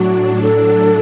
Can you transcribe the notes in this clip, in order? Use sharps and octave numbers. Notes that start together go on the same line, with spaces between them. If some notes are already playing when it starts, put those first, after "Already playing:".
Already playing: A2 F#3 D4 F#4
A4